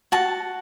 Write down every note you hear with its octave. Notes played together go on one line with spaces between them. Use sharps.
F#4 A5